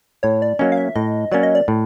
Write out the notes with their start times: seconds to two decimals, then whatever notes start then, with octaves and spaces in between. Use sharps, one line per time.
0.23 A2 C#5
0.42 D5
0.59 F#3 A#3 C#4 D#5
0.72 F5
0.77 E5
0.95 A2 D#5
1.32 F#3 A#3 C#4 D5
1.43 D#5
1.55 D5
1.68 A2